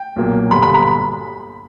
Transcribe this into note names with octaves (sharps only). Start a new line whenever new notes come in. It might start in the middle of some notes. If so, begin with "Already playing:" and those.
Already playing: G5
B1 A#2 F#3 A#3
G1 G2 D3 G3 B5
B5
B5